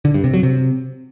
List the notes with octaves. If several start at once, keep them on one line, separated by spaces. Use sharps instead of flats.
D3
G2
C3
F#3
C3